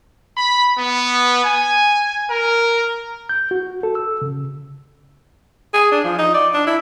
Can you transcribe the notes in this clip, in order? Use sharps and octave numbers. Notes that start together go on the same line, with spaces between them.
B5
B3
G#5
A#4
G6
F#4
A4
E6
C#3
G#4
D4
F3
D#4
D5
D4
E4